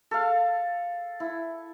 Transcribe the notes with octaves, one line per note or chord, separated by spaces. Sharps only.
A4 F5
E4